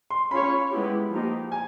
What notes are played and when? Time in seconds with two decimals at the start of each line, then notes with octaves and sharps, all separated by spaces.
0.10 C6
0.31 C#4 F4 G#4 C#5 B5
0.71 G#3 B3 E4 G4
1.11 F3 A#3 D#4 G4
1.52 G#5